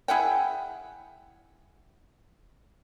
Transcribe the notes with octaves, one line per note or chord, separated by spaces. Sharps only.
E4 G#4 F#5 G5